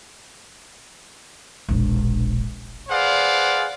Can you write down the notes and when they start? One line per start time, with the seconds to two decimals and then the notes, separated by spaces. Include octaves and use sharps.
1.69 E1 A#1
2.89 G#4 B4 C5 D5 F5 F#5